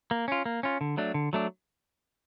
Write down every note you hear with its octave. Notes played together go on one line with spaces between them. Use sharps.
A#3
C#4 F4
A#3
C#4 F4
D3
F#3 A3 D4
D3
F#3 A3 D4